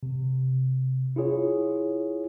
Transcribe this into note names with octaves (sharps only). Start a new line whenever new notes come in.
C3
E4 F4 G#4 C#5